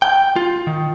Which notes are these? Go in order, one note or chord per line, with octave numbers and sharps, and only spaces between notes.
G5
F4
D#3